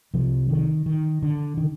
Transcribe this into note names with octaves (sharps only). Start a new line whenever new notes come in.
C2 C3 F3
D#3
D#3
D3
D#3
C#3